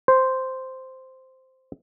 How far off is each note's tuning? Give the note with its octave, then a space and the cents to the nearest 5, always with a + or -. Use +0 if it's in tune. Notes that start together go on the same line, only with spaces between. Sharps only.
C5 -5